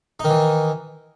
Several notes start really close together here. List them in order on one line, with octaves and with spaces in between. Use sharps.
D#4 D#3 E3